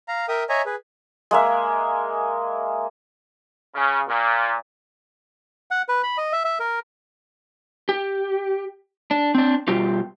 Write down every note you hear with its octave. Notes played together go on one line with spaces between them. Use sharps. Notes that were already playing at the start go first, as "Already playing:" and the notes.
F5 A#5
A#4 E5 G5 D#6
C#5 D#5 E5 G#5 A#5
G#4 B4
G#3 A#3 E5
C#3
A#2
F#5
B4
B5
D#5
E5
E5
A#4
G4
D4
C4 D4
B2 G3 F4 G4